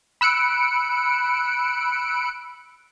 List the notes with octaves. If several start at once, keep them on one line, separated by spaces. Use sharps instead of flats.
B5 E6 F#6 C#7 D7